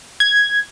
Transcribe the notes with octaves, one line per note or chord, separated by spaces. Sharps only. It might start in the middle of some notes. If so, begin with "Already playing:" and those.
G#6